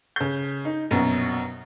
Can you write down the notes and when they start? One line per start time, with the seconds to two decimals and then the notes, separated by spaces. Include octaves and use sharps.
0.16 C#3 G6
0.65 D#4
0.91 A#1 F#2 B2